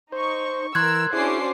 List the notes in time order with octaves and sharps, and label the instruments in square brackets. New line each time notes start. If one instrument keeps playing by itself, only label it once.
[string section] D#4 C#6 [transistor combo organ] C5
[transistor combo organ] E3 [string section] A#4 [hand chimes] C6 F#6 G#6 [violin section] E6
[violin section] C#4 D4 C7 [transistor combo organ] E4 G#4 [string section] F#4 C5 D6